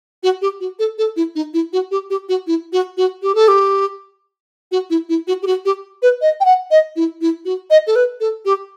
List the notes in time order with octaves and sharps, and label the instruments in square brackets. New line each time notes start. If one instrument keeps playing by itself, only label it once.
[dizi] F#4
G4
F#4
A4
A4
E4
D#4
E4
F#4
G4
G4
F#4
E4
F#4
F#4
G4
A4
G4
F#4
E4
E4
F#4
G4
F#4
G4
B4
D#5
G5
F#5
D#5
E4
E4
F#4
D#5
A4
B4
A4
G4